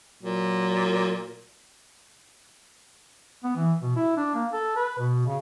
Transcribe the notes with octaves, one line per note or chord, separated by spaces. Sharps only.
A#2 F#3
B3
E3
B2
E4
D4
A#3
A4
B4
B2
C#3